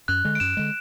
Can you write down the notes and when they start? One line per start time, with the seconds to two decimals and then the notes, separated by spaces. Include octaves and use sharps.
0.08 F#2 F#6
0.25 D3 G#3
0.35 D7
0.40 F#2 E7
0.57 D3 G#3